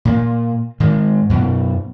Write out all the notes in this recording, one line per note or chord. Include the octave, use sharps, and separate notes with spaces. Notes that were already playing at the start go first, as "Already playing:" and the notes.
A#2 A#3
G#2 D#3 G#3
F#2 B2